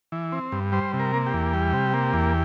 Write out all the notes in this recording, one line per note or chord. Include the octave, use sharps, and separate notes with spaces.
E3
C4
G2
G3 C5
C3
A#4
A#3
G4
E2
G3
C3
A#3
E2